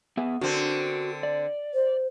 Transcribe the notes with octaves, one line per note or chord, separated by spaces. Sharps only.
B3 G#4 E5
D3 C4 F#4 A#4
D5
C5